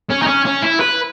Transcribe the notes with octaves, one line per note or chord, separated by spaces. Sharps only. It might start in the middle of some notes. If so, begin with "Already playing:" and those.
C#4
D#4
C#4
C#4
E4
B4